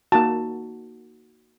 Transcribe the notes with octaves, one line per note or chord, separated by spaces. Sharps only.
A#3 D#4 F#4 A5